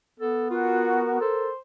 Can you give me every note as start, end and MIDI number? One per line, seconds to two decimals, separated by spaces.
0.20 1.18 59
0.20 0.50 69
0.50 1.02 65
0.50 1.18 66
0.50 1.52 70
1.21 1.50 69
1.21 1.56 72